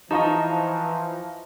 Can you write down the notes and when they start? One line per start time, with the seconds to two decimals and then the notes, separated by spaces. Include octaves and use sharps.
0.11 E3 F3 D#4 F4 D#5 A5 A#5 C#6